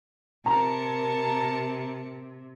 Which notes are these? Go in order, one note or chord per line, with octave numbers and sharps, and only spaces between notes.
C3 A#4 A5 A#5 C#7